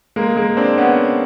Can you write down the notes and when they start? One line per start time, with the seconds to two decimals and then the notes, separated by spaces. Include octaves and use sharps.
0.16 G#3 A#3
0.37 G#3 A#3
0.57 C4 D4
0.78 B3 C#4